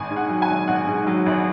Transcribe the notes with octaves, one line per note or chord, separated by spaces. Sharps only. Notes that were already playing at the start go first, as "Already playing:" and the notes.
Already playing: G#1 G#5
G#2
F#5
F#3
G#5
G#1
G#1 F#5
G#2
F#3
G#1